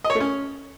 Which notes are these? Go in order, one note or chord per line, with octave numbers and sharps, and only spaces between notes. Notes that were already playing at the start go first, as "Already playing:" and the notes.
D#5
C#5
A3
C#4